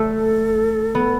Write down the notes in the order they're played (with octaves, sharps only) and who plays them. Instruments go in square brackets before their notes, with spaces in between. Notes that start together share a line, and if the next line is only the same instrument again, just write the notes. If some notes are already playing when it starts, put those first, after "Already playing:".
Already playing: [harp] A3 [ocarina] A4
[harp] B3